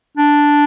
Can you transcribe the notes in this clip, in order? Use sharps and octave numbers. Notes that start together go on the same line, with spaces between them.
D4